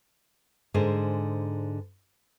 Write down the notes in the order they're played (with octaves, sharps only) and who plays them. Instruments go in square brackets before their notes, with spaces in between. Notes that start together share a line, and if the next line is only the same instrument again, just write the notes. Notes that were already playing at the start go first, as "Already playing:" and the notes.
[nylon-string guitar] G#2 D3 G#4 A#4 C5